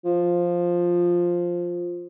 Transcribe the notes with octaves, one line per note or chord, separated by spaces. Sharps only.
F3